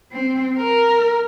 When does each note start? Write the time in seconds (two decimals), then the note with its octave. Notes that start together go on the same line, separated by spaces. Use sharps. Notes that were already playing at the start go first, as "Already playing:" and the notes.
0.12 C4
0.57 A#4